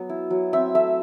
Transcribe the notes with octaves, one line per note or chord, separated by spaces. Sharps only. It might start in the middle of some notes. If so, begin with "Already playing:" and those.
Already playing: F#3 B3
E4
F#3
C4 E5
A3 E5